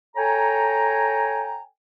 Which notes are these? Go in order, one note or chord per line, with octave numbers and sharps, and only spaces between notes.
A4 C#5 G5 G#5 A#5